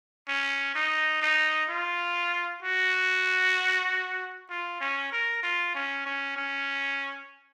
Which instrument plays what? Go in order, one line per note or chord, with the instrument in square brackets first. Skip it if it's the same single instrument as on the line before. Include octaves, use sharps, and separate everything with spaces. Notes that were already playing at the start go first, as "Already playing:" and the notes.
[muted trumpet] C#4
D#4
D#4
F4
F#4
F4
C#4
A#4
F4
C#4
C#4
C#4